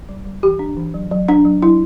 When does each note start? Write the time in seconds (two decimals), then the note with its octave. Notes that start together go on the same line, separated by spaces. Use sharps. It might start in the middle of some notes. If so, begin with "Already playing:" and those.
0.09 G3
0.25 G3
0.43 E3 G4
0.59 D4
0.77 E3
0.94 F#3
1.11 F#3
1.28 D4
1.45 F#3
1.62 F#3 E4